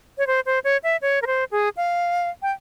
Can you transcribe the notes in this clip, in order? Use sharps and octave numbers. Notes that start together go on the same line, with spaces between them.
C#5
C5
C5
C#5
E5
C#5
A#4
C5
G#4
F5
G5